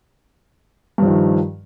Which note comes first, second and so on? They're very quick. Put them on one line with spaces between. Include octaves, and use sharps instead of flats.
G2 F3 D#3